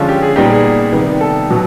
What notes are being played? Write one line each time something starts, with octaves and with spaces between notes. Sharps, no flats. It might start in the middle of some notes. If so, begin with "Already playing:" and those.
Already playing: D3 F3 G#3 C#4 F4
G4
G#4
A#2 G3 B3 D#4 G4
G#4
C3 D#3 G3 B3
A4
B2 F#3